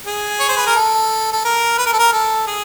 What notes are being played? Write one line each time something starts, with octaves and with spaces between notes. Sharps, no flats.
G#4
C#5
C5
B4
A#4
A4
A4
A#4
B4
A#4
A4
A#4
A4
G#4